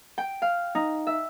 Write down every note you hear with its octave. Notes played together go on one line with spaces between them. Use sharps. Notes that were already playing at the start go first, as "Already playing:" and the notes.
G5
F5
D#4
E5